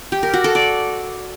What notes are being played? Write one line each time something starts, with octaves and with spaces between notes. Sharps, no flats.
G4
A#4
F#4
A4
D5